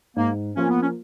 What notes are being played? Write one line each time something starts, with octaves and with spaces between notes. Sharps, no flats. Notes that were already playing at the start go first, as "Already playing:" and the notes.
G#2 A#3
F3 A#3 C#4 F4 A#4
B3
C#4